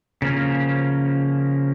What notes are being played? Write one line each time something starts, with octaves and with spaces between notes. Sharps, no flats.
C#3 F3 A#3 C#4